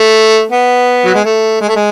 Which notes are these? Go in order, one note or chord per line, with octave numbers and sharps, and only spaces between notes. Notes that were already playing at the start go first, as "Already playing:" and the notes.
Already playing: A3
B3
F#3
G#3
A3
G#3
A3
G#3